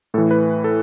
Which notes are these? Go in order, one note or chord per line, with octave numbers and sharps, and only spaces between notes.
A2 E3 A4
B4
A4